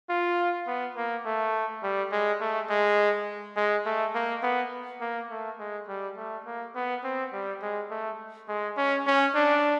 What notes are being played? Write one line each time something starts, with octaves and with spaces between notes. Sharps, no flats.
F4
B3
A#3
A3
G3
G#3
A3
G#3
G#3
A3
A#3
B3
A#3
A3
G#3
G3
A3
A#3
B3
C4
G3
G#3
A3
G#3
C#4
C#4
D4